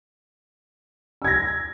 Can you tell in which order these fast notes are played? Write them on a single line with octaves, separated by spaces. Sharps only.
E6 G#6 A#6